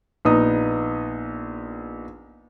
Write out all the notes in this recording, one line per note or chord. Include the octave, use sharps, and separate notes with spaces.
A#1 B3 D#4 D#6